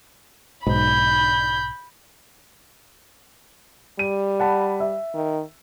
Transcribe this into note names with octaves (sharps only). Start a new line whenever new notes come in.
B1 G#2 B5 G6
G3 D#7
F#5 A5 B5
E5
D#3